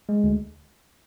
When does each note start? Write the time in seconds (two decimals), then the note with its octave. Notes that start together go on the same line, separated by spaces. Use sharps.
0.09 G#3
0.24 D2